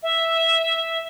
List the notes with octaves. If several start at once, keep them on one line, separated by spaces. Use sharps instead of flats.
E5